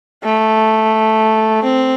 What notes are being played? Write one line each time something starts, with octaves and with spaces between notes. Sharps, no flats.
A3
C4